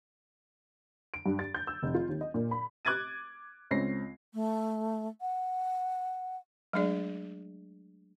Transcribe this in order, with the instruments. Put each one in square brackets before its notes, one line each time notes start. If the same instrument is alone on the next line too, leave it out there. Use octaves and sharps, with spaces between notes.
[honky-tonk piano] D7
G2
A6
G6
E6
F1
F4
D#2
D#5
A#2
B5
[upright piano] D6 F#6 G#6 A6 D#7
C#2 C4 C#4 A#6 C7
[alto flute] A3
F#5
[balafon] F#3 G#3 A3 D4 G#4 D5